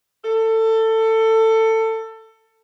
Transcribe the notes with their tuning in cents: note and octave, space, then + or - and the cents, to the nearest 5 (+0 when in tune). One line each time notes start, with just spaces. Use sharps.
A4 +20